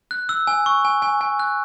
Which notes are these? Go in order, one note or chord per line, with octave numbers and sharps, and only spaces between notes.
F#6
E6
G#5
C#6
G#5
G#5
G#5
F#6